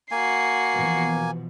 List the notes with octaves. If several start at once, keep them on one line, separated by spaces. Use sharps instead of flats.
A#3 F#4 G#5 C7
B2 E3 F3